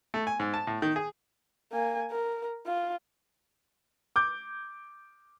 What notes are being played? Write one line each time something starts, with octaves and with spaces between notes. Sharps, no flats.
A3
G#5
G#2
A5
A2
D#3
G#4
A#3 G#5
A#4
F4
D6 G6